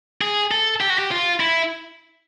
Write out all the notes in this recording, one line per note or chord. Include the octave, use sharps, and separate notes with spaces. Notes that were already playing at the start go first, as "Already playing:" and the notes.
G#4
A4
G4
F#4
G4
F4
E4